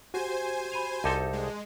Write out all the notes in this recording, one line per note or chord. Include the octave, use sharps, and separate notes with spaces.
F#4 G4 C5 G#5
B5 D#7 F7
C2 D#4 A4 A5 D6 G6
G#3